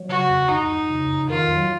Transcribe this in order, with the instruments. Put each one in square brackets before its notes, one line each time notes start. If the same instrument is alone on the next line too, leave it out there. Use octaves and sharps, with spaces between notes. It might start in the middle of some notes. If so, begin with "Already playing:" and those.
Already playing: [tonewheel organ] F#3
[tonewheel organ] C#3 [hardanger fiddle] F#4
[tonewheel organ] F2
[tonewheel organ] F2 [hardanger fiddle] D#4
[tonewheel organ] F2
C#3
F2
[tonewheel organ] D#3 [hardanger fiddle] F4
[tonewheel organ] F#3